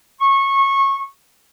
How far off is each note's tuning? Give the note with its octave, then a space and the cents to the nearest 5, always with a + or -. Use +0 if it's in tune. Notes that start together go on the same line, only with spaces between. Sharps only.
C#6 -20